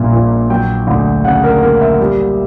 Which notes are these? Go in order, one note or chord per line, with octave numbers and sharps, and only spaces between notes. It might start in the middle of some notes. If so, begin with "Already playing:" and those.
Already playing: A#1 A#2 G3 E5
A#1
F#3 G5
D2
C#3 F#5
A#4
A#3 A#4
E5
G3